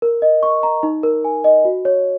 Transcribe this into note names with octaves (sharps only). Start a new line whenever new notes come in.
A#4
D#5
C#6
A#5
D#4
A#4
G#5
D#5
F#4
C#5